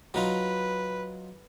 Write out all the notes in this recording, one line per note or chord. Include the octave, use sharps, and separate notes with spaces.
F#3 D#4 F4 B4